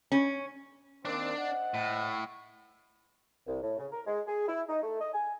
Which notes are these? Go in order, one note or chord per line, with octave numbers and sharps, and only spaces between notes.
C#4
D#3 A#3 C4 D4 D5
C5 D#5 F#5
A2
C2
A2
C#3
A#4
G#3
G#4
E4
D#4
A3
D#5
G#5